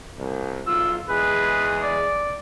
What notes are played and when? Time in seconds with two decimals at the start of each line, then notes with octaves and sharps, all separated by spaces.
0.18 C2
0.67 B1 F4 E6
1.09 E2 G#3 G#4 B4
1.83 D5